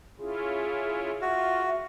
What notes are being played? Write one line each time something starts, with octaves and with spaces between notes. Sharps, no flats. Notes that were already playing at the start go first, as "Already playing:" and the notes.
C#4 E4 F4 G#4
F4 F#4 E5